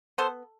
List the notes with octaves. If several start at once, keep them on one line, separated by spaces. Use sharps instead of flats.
B3 A4 C5